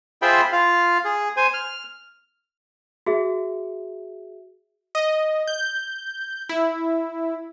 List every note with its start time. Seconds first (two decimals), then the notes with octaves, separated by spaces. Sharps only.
0.22 F4 G#4 C5 E5 G5 B5
0.52 F4 F5
1.05 G#4
1.37 C5 G#5
1.54 F6
3.07 F#4 G#4 E5
4.95 D#5
5.47 G6
6.49 E4